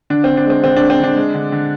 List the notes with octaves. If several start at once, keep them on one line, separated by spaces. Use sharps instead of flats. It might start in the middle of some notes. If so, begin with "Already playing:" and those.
D3 D4
D3 C4
D4
G#3 C4
D3 C4
G#3 D4
C4
D3 D4
G#3
D3
D3